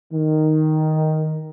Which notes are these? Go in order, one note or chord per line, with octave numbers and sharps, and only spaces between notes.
D#3